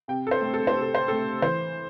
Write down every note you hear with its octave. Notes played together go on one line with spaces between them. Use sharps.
C3 G5
A4
C5
A3 C4
A4
C5
C3
A4
C5
A3 C4 A4
E3 C5